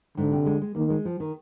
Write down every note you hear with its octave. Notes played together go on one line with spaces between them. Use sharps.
G#2 D3
C3
G#3
G#3
D#3 A#3
G#3
F3
D#3